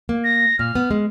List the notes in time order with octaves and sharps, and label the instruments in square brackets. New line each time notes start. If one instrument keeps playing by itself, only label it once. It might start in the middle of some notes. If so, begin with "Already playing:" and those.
[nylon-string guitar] A#3
[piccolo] A#6
[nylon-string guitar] A#2 [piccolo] F6
[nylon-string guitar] B3
G#3